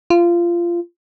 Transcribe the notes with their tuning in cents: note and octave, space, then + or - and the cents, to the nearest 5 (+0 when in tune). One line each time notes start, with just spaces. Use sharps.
F4 -20